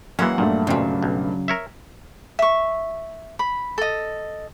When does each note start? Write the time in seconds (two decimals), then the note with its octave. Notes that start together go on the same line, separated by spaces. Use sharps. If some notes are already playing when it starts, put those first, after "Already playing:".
0.19 E3 F#3 G#3 A#3 C#4 F#5
0.38 G2 A#2 A3
0.67 B1 F2 A#2 C#3 F#3
1.02 B1
1.48 A#4 C#5 E5
2.39 E5 C#6
3.39 B5
3.78 A4 D#5